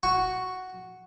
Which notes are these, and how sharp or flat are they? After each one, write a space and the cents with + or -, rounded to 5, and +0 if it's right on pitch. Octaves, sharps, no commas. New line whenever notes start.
F#4 +0 C#6 +0